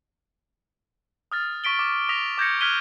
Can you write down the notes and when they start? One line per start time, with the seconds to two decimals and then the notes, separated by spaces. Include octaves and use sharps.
1.32 D#6 F6 A6
1.64 C#6 B6 D7 G7
1.79 D6
2.09 D#6 A#6 B6 F7
2.38 D6 G6 G#6 A#6 C#7
2.61 F6 F#6 G#6 B6 D#7 G7